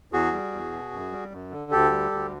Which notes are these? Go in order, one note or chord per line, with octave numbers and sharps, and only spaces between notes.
E2 F#4 G#4
G3
E2
B2
F#2
G3
F#2
D3
D2 G4 A4
G3
D2